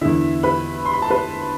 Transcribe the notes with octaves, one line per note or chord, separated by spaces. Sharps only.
E2 D3 E4 E5
B4 B5
C6
B5
A5
B4 B5